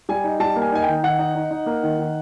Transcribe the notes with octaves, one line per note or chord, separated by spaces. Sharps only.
G3 G#5
D#4
G3 A5
A#3
G#5
D#4 G#5
D#3 G5
D#3 F#5
D#4
D#4
D#4
A#3
D#3
D#3